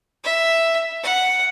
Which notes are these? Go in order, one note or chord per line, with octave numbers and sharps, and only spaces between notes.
E5
F#5